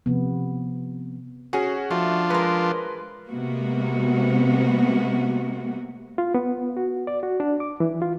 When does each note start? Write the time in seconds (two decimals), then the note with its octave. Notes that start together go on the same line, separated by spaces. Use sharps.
0.06 C3 F3 B3
1.53 C#4 F#4 G#4
1.90 F3 A3 D4 F4 F#4
2.30 G#3 A#4 B4
3.29 C3 G#3 A#3 B3 F#4
6.18 F4
6.34 B3
6.77 F#4
7.07 D5
7.23 F#4
7.40 D4
7.60 D6
7.80 E3
8.02 F4